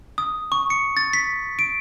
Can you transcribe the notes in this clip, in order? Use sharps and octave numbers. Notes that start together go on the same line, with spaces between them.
D#6
C#6
C#7
A6
B6
D7